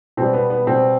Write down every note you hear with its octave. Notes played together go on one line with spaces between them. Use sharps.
B2 G3 C4
B3
B3
B2 G3 C4